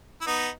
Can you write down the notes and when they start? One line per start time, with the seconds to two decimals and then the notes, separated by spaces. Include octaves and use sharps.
0.21 E4
0.27 B3 D#4